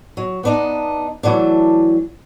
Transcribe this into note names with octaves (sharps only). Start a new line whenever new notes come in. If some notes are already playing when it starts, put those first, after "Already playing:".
F#3
B3 D4 D#4
E3 F#3 A3 D4